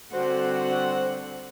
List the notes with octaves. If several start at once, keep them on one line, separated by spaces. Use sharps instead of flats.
D3 G3 C4 F#4 C5 F#5